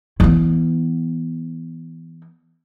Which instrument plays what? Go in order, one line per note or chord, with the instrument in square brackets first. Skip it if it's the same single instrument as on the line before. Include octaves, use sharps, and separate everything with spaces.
[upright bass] E3 B3